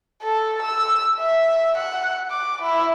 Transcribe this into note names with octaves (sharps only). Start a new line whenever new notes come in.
A4
E6
E5
F#5
D6
E4